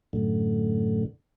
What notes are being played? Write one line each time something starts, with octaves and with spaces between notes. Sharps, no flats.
F#2 A2 D3